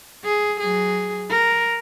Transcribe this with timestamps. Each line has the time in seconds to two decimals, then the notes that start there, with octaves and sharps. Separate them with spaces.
0.24 G#4
0.60 F#3 G#4
1.30 A#4